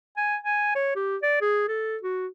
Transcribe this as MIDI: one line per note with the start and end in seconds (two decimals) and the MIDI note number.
0.17 0.36 80
0.43 0.72 80
0.75 0.94 73
0.95 1.17 67
1.22 1.40 74
1.41 1.64 68
1.68 1.97 69
2.03 2.27 66